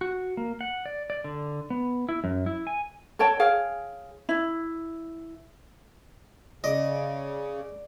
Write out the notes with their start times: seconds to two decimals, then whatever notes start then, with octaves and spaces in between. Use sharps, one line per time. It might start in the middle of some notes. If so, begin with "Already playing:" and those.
0.01 F#4
0.37 A#3
0.61 F#5
0.86 D5
1.10 D5
1.24 D3
1.70 B3
2.09 E4
2.24 F#2
2.46 E4
2.67 G#5
3.19 A4 C#5 G5 A5
3.40 G#4 C#5 F5 G5
4.29 E4
6.64 C#3 D5 D#5